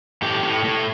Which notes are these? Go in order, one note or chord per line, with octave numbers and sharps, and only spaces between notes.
A2 G4
A2
A2